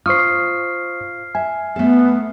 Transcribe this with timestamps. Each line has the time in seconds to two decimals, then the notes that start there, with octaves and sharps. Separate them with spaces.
0.06 F4 C5 C#6 D#6 F6 C7
1.35 E5 G#5
1.76 A3 B3 A4